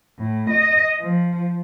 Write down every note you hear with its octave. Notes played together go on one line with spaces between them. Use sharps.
A2
D#5
F3